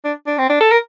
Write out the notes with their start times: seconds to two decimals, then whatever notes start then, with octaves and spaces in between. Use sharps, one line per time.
0.05 D4
0.27 D4
0.38 C4
0.50 D4
0.61 A4
0.72 A#4